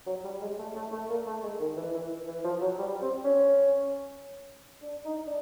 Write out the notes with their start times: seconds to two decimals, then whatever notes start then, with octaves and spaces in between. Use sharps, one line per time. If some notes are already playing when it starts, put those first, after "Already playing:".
0.07 F#3
0.24 G3
0.42 G#3
0.59 A3
0.75 A3
0.92 A3
1.10 A#3
1.27 A3
1.43 G#3
1.60 D#3
1.77 E3
1.94 E3
2.28 E3
2.44 F3
2.61 F#3
2.78 G3
3.02 C4
3.24 C#4
4.82 D4
5.05 D#4
5.27 D4